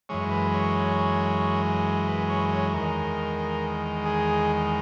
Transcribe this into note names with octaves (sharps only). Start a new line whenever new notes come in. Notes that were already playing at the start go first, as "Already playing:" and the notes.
F#2 E3 G#3 C#5
B4
C#5
B4
C#5
C#5
E2 D#3 G#3 A#4
G#4